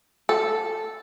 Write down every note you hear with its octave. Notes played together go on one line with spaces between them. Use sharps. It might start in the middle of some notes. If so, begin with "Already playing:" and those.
A4